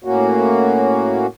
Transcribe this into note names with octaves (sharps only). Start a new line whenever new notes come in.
A2 A#3 C#4 F#4